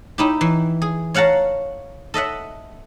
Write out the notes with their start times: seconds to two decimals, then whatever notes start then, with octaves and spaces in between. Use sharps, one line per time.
0.18 D#4 E4 G4
0.41 E3
0.82 G#4
1.14 C#5 F5 F#5 A5 A#5
2.14 A4 D#5 E5 F#5